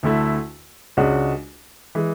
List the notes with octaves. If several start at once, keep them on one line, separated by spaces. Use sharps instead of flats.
D2 D3 A3 E4
C#2 C#3 G#3 D4 F#4
E3 G#3